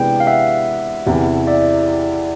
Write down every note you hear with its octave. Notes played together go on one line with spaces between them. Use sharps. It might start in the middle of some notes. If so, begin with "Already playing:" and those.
Already playing: C3 E3 G#3 B3 D4 G5
F5
E5 F#5
E2 C3 E3
D5 E5